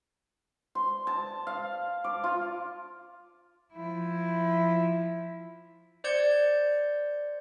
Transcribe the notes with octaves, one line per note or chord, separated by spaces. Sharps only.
C6
A5
F5
D6
F4
F3 E4
C5 D5 G6 G#6 C#7